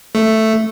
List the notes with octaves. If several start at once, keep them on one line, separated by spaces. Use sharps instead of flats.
A3